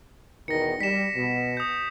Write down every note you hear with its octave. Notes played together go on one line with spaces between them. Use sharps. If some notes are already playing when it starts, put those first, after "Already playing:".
E2 B2 D#3 A#6 C#7
G3 B6 E7
B2
D#6 G6